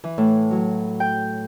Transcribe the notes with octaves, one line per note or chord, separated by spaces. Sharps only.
E3
A2
F#3
G5